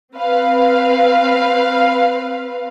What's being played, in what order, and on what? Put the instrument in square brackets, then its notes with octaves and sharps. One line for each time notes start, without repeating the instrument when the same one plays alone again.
[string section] C4 B4 F5